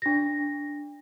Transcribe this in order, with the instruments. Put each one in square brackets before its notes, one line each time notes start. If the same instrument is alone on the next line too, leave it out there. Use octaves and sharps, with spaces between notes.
[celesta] D4 A#6